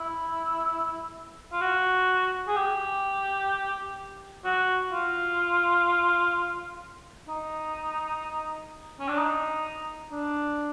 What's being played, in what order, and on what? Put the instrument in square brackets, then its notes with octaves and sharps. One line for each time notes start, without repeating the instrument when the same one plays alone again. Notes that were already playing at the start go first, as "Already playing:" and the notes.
Already playing: [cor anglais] E4
F4
F#4
G#4
G4
F#4
F4
D#4
C#4
D4
D#4
D4